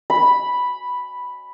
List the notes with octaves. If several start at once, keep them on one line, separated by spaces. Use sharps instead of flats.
B5